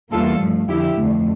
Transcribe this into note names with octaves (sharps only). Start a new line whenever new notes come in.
E2 E3 G3 A#3 F4 A4
G2 F3 A3
F2 D3 F3 E4 G4
F2 D3 A3